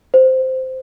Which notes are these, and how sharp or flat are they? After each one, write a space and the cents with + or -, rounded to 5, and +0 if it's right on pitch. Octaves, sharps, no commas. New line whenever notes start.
C5 -10